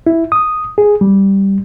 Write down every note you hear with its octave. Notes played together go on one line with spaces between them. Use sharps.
E4
D#6
G#4
G3